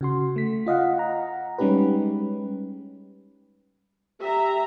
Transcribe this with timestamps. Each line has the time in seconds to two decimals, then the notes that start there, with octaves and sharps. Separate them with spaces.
0.01 C#3 F#4 C6
0.36 A3 B6
0.66 F4 D#5 F5 F#5
0.98 F#5 A#5
1.58 G3 G#3 C#4 D#4 G4 B4
4.21 G4 E5 A#5